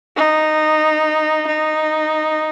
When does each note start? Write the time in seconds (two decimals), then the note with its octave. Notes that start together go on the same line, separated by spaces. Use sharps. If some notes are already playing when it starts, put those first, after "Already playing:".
0.16 D#4
1.47 D#4